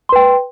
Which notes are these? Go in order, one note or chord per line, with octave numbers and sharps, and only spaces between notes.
B4 G5 C6